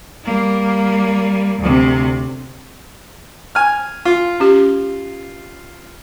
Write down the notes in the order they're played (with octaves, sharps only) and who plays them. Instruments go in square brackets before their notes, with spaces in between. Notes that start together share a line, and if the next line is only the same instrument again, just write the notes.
[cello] G3 A#3
D2 C3
[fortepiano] G#5 F6
F4
[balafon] C#4 G4